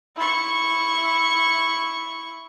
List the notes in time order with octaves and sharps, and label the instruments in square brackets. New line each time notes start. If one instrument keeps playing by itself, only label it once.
[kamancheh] E4 C#6